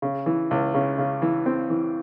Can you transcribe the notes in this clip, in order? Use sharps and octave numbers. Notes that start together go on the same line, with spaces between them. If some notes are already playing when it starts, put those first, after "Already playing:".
C#3
E3
C#2
C#3
C#3
E3
C4
E3